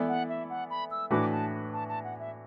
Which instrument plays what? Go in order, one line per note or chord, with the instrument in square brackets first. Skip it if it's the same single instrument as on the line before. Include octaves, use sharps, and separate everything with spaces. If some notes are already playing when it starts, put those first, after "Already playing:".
Already playing: [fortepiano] E3 B3 E4 A4 D5
[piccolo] F#5
E5
F#5
B5
E6
[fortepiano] A2 E3 D4 F#4 B4 [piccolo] D6
[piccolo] A5
A5
A5
F#5
E5